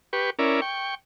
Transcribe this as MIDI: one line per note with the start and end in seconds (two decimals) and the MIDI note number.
0.13 0.30 67
0.13 0.30 71
0.13 0.30 85
0.39 0.61 61
0.39 0.61 64
0.39 0.61 70
0.39 0.61 74
0.62 0.95 79
0.62 0.95 85